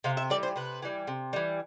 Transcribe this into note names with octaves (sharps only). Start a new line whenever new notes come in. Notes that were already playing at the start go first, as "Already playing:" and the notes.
C3 F5
E5
E3 G3 D5
C5
C3 B4
E3 G3
C3
E3 G3